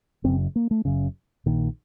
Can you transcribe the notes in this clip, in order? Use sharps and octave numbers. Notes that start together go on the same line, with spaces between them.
F#1 F#2 C#3 C4
A#3
A3
F#1 F#2 C#3
A#1 A#2 D#3